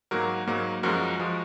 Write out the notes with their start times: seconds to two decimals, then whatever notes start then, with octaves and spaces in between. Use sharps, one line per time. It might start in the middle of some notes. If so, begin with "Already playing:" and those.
0.11 G#2 F#3 A#3 F#4 A#4
0.47 G#2 F#3 A#3
0.83 F#2 F3 G#3 F#4 A#4
1.19 F3 G#3